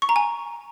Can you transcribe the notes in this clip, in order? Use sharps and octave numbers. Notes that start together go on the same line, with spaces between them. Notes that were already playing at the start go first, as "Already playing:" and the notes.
C#6
A#5
G#5